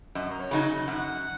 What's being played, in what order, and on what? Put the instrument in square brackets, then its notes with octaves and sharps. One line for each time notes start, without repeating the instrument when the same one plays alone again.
[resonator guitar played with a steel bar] F#2 [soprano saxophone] D#5
[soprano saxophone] A#4
C#5
[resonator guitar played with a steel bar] C#3 F#3 D#4
[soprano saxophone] D#5
[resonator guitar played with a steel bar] F#2 [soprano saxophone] F#5